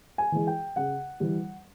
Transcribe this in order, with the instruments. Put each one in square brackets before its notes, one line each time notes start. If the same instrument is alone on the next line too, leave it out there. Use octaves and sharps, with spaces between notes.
[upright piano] G#5
E3 G#3
G5
C#3 F#5
E3 G3